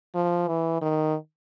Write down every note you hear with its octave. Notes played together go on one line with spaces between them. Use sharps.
F3
E3
D#3